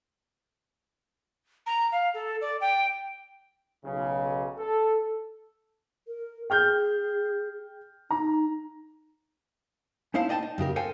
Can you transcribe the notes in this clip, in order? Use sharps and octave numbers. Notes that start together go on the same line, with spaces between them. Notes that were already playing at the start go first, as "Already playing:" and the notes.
A#5
F5
A4
D5
G5
B1 C#3
A4
A#4
G#4 G5 F6 G6
D#4 A#5
C#4 D#4 E4 C5 F5 A5
D5 D#5 G5 A5
D#4
F#2 C#3 G4 A#4
A4 A#4 C5 F5 G5 G#5